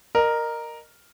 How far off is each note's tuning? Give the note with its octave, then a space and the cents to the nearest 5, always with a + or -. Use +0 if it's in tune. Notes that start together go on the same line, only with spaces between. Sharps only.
A#4 +0 D#5 -30